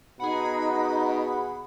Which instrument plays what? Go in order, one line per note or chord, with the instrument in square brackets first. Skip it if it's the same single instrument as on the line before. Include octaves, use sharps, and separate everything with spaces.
[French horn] B2 [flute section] D#4 [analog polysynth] G#4 F#5 [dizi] B5